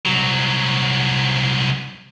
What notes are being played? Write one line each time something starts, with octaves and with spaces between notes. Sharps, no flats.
C2 F#3